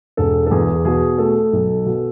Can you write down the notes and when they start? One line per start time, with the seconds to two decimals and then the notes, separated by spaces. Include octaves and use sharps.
0.17 E1 A4
0.47 A4
0.51 E2 G#4
0.85 B2 G#4
1.18 A3 A4
1.53 B1
1.86 B2